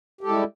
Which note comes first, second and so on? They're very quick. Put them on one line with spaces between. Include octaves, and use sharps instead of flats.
G4 A4 G#3 E4 G3